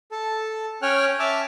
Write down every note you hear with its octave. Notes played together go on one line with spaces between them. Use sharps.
A4 A5
C#4 C#5 G5 G#5 F6 F#6
E5 G#5 A5 D6 E6 F6